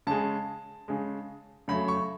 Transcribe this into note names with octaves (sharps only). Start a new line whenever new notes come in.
C#3 G#3 A5
C#3 G#3
C#3 F#3 A3 B5
C#6